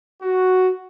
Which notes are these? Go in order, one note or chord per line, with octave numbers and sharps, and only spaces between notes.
F#4